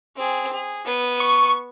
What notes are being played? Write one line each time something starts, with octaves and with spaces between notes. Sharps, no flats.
C4 G#4
G#4
B3 D#7
C#6